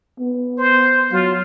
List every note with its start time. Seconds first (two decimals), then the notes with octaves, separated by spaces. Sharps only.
0.20 B3
0.58 C5
1.12 F#3 F4